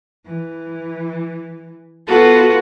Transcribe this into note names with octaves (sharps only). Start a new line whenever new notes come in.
E3
B3 F4 F#4 A4 B4